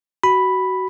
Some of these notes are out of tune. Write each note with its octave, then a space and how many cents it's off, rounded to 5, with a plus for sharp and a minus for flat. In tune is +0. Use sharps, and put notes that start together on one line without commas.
F#4 +20 B5 +0